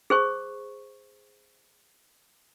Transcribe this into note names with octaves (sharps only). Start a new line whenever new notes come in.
G#4 C5 C#6